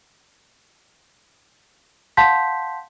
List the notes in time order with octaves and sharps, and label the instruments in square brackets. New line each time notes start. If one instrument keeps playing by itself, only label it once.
[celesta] F5 F#5 A5 C6 G6 B6